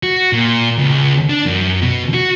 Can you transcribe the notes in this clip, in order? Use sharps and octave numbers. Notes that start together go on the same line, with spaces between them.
F#4
A#2
C#2
D4
F#2
B2
F#4